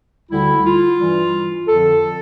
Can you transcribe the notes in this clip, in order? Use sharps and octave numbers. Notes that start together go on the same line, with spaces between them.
D2 D3 G3 E4
F4
G2 E3 G3
F2 D3 F3 A4